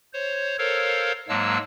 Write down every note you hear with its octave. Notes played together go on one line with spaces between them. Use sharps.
C5 C#5
A4 A#4 C5 C#5 F5
G#2 F#3 G#3 A#3 A5 E6